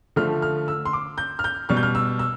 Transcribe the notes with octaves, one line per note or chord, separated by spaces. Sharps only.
D3 F3 A3 F6
F6
E6
C6
D6
G6
F6
G6
B2 G3 F6
G6
F6
E6
E6